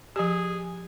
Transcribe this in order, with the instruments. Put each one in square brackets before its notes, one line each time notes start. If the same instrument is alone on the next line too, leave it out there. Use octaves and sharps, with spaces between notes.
[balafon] F3 G4 [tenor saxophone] G#4